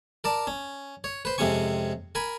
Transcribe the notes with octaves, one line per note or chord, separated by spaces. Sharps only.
A#4 D5 A5
C#4
C#5
B4 C5
F2 C3 G#3 C#4 G#5 C#6
A#4 G#5 B5